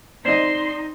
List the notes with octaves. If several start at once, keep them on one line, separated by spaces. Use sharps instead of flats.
C4 D#4 D5 D#5 C6 C7 E7